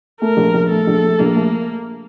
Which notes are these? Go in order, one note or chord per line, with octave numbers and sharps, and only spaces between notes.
A3 A#4
A#1
A#1
A3 A4
A#1
A3
A#1 A#3
A3